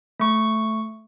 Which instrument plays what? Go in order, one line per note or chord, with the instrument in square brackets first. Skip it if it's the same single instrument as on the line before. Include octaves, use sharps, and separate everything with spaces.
[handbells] A3 C#6